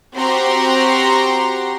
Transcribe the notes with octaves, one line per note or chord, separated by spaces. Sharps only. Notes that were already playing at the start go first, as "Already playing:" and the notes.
C4 F#4 G4 A#5 C6